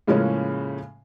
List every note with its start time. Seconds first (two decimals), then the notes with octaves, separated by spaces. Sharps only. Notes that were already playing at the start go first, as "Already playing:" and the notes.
0.07 A2 C#3 F3 G#3 A#3 C#4